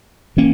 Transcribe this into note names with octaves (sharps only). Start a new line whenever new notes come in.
E3 A#3 C#4